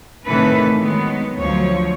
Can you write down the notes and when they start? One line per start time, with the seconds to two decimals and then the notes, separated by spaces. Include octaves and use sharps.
0.24 A2 C3 D#3 E3 A4 B4
0.77 D#3 F#3 G#3 B3
1.36 D2 F3 F#3 C#5